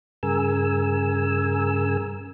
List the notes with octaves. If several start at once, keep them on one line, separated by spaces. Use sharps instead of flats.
G2 C#3 G#4 A#4 G#5 E6